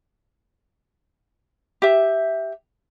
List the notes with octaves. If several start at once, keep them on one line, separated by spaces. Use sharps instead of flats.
G4 E5